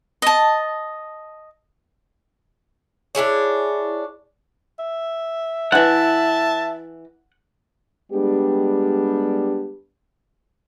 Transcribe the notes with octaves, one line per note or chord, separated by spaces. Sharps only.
D#5 A5
D4 E4 G#4 C#5
E5
E3 E4 F#5 A5
G3 G#3 B3 D4 G4